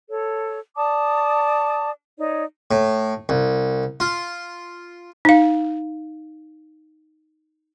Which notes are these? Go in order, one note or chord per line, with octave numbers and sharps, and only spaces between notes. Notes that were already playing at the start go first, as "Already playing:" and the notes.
A4 C#5
D5 A5 D6 D#6
D#4 C#5 D5
A2
C2
F4
D#4 F5